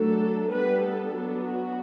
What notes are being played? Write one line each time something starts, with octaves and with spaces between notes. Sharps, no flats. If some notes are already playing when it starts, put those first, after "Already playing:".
Already playing: F#3 A3 D4 A4
G3 B3 D4 B4
A4
F#3 B3 D4
F#4